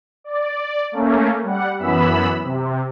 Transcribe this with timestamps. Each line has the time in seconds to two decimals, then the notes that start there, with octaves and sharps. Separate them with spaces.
0.24 D5
0.92 A3 A#3 C#4
1.43 G3 F#5
1.79 F#2 E3 B3 B5 E6
2.43 C3